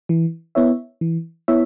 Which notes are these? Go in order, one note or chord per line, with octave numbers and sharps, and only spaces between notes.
E3
B3 E4 C#5 E5
E3
B3 E4 C#5 E5